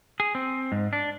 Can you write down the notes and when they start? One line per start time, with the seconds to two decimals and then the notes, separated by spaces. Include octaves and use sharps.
0.20 G#4
0.35 C4
0.72 G#2
0.93 D4